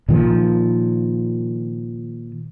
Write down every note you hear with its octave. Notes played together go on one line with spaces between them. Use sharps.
A#2 D#3 F3